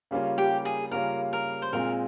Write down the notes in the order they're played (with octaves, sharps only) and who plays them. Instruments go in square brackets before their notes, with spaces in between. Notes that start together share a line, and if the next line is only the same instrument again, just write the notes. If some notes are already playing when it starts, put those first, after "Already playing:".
[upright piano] C#3 G3 A#3 C#4 F4
[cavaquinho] G4
G#4
[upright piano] C#3 G3 A#3 C#4 F4 [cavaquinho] A#4
[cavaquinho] A#4
C5
[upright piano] A#2 G#3 C4 F4 [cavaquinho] A#4